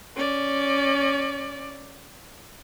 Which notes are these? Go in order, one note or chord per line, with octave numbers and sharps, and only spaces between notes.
C#4 D5